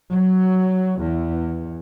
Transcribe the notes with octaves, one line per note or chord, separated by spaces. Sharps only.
F#3
E2